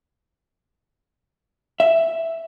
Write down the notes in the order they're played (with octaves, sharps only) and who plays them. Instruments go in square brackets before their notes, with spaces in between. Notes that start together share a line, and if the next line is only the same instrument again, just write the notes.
[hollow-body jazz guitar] E5